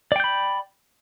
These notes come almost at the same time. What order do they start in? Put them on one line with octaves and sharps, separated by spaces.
D5 G5 G6 B5